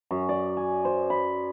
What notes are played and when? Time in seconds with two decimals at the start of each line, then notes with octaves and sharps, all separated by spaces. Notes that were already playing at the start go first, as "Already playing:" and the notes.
0.11 F#2
0.29 D5
0.57 G#5
0.85 C5
1.10 B5